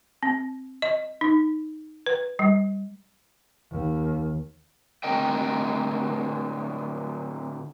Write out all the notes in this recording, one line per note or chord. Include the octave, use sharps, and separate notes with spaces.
C4
D#5
D#4
B4
G3
D#2
A2 D3 C4 A#4 D#5 G5